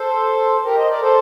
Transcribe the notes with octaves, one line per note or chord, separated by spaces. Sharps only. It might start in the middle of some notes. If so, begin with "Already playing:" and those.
Already playing: A4 C5
G4 A#4
C5 D#5
A#4 D5
A4 C5